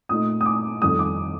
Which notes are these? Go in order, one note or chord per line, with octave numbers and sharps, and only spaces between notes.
A#2 A3 D#4 D#6
D#6
D6
F2 D#3 G3 D#6
D6